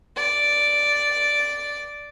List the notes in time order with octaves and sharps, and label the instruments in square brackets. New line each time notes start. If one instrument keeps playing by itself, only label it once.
[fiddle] D5